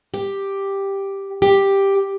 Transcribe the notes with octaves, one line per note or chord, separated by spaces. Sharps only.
G4
G4